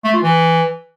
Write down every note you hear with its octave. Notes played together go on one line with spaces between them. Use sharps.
A3
F4
E3